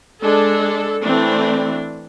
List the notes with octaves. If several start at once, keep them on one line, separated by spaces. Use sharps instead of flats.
G#3 D4 A4
E3 A3 C4 D4